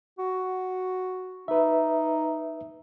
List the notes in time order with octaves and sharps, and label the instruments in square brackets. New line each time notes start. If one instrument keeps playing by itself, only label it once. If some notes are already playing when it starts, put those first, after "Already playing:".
[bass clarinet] F#4
[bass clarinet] D#4 [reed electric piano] B4 E5